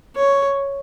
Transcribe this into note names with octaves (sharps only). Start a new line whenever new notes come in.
C#5